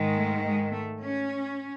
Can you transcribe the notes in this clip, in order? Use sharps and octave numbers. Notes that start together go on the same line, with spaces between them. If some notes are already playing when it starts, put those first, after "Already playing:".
Already playing: G#2 D#3 G#3
A3
G#3
A3
C#4